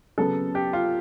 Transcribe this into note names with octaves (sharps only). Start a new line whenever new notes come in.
C#3 F#3 B3 A4
G4
F4